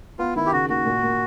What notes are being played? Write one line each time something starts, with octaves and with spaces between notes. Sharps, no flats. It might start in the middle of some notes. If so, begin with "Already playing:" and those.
B3 F4
D#3 E4
G4
C#3 F#4
D#2 F#4
A#2
A#3